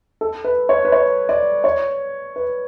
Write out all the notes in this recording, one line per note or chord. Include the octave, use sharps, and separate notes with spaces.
A4
B4
C#5
B4
C#5
D5
C#5
B4